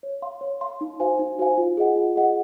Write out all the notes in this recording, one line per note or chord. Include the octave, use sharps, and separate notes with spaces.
C#5
F5 C6
C#5
F5 C6
D#4
F#4 C5 F5 G#5
D#4
F#4 C5 F5 G#5
F4
G#4 D#5 F#5
F4
G#4 D#5 F#5